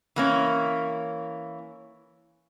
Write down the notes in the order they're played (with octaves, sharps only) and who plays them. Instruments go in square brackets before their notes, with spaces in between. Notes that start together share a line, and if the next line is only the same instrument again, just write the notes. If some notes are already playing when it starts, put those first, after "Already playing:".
[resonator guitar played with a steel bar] E3 A#3 C#4